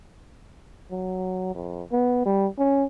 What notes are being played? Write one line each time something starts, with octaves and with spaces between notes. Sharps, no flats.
F#3
F2
B3
G3
C#4